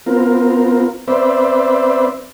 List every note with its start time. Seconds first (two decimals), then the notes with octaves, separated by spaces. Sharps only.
0.06 B3 C4 F4 A#4
1.08 C4 B4 C5 D5 E5